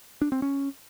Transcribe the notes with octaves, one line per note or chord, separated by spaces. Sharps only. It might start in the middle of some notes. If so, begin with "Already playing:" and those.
D4
C4
C#4